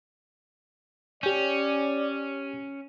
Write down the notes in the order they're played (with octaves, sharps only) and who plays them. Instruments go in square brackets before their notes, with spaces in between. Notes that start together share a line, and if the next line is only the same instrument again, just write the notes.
[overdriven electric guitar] C#4 [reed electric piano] G4 G6 [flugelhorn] D5